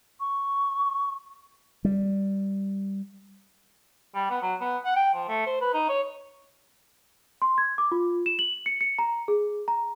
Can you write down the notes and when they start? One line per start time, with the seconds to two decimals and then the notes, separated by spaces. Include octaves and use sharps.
0.20 C#6
1.85 G3
4.15 G3
4.30 B3
4.42 F#3
4.60 B3
4.85 F#5
4.96 G5
5.14 F3
5.28 A3
5.46 C5
5.61 B4
5.73 D#4
5.89 C#5
7.42 C6
7.58 G#6
7.78 D6
7.92 F4
8.26 E7
8.39 F#7
8.66 C#7
8.81 C#7
8.99 A#5
9.28 G#4
9.68 A#5